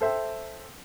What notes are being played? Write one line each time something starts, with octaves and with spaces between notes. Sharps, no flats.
A4 C5 E5 G5